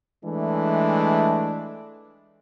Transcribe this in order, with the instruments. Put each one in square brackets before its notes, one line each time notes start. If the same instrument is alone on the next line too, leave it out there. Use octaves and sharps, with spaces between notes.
[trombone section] E3 G#3 A3 D4